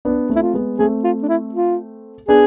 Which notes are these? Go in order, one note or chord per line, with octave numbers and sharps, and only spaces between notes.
B3 D4
A3 C4
E4
F4
G#3 B3
A3 C4 G#4
F4
D4
E4
F4
B3 D4 G#4